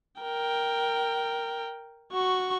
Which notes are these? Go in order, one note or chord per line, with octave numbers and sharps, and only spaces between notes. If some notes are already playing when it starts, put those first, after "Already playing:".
A#4 G5
F#4 C#6